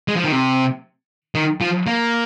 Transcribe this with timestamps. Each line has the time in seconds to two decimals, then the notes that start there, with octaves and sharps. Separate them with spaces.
0.08 G#3
0.16 F3
0.24 D#3
0.32 C3
1.35 D#3
1.61 F3
1.87 A#3